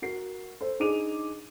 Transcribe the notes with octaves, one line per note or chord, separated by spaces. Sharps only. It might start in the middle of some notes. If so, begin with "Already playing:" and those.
F#4 A#4 C7
A4 C5
D4 D#4 G#4 D6 D#7 F7